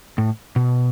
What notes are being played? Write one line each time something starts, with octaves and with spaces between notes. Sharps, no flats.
A2
B2